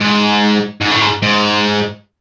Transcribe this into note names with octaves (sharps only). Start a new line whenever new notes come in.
G#2
G#2
A2
G#2
G#2